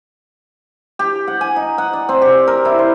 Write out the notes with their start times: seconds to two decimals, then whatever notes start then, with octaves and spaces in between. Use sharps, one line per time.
0.99 G4
1.28 F#5
1.41 G#5
1.56 D#4
1.78 F#5
1.93 D5
2.09 C4
2.22 G4
2.47 A#4
2.65 E4
2.79 C5